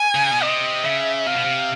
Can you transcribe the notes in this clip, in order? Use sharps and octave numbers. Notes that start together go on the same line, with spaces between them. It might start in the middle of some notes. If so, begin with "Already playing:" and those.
Already playing: G#5
C#3
B2
C3 D#5
C#3 E5
C3 F5
B2
C3